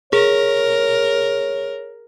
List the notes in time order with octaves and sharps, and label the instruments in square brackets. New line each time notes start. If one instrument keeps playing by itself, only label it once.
[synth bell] G#4 [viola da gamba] A#4 [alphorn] C#5